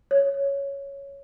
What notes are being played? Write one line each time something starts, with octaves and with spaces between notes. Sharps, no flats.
C#5